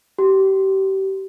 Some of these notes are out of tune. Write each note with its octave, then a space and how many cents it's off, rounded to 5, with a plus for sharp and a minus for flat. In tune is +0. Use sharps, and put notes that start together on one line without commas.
G4 -30